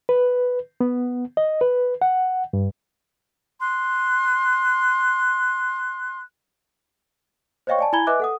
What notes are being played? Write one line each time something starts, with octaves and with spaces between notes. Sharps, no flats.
B4
B3
D#5
B4
F#5
G2
C6 F#6
C5 C#5 D#5 F5 G5 C#6
D5 G#5 A5
E4 G#5 A#5 B5 G#6 G7
B4 D#5 E5 G#5 D6 F#6
A4 F#5 D#6